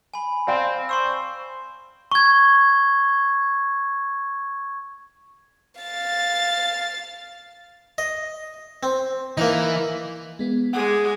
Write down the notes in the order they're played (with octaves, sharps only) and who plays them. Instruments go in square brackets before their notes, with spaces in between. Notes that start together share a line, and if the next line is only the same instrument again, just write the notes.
[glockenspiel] G#5 B5
[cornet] C4 [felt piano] D5 F5 G5
[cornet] C5 [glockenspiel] C6 C#6 E6
[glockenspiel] C#6 G#6
[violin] F5 A6
[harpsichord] D#5
C4
[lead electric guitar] E3 [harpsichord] A#3 D#4
[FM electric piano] G#3 B3
[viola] G#3 G#4 [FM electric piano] F#5 D6